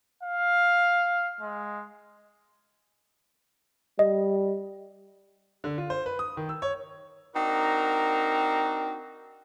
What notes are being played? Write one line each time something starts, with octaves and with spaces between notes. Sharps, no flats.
F5
G#3
G3 D#5
D3
F4
C5
B4
D#6
D#3
E6
C#5
C4 D4 D#4 F#4 A#4